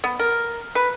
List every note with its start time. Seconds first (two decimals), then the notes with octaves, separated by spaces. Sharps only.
0.04 B3
0.19 A#4
0.75 B4